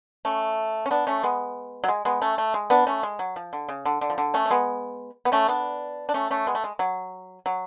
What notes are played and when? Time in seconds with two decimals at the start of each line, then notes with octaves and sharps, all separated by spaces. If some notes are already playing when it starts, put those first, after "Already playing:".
0.25 A3 C#4
0.86 C#4
0.91 B3 D4
1.07 A3 C#4
1.23 G#3 B3
1.84 F#3
1.88 G#3
2.05 G#3 B3
2.22 A3 C#4
2.38 A3
2.54 G#3
2.70 B3 D4
2.87 A3 C#4
3.03 G#3
3.19 F#3
3.36 F3
3.53 D3
3.69 C#3
3.85 D3
4.01 D3
4.10 F3
4.18 D3
4.34 A3 C#4
4.45 C#4
4.50 G#3 B3
5.25 B3
5.32 A3 C#4
5.48 B3 D4
6.09 D4
6.14 A3 C#4
6.30 A3 C#4
6.47 G#3 B3
6.55 A3
6.64 G#3
6.79 F#3
7.46 F#3